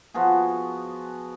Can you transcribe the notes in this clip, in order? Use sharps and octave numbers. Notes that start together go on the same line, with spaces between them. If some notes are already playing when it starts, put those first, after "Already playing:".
F3 B3 F#4 G#4